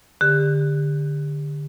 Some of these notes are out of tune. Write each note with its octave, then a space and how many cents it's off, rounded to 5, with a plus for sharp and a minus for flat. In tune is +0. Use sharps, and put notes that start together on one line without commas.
D3 +0 G4 +30